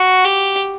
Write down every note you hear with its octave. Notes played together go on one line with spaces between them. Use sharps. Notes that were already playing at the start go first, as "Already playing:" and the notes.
Already playing: F#4
G4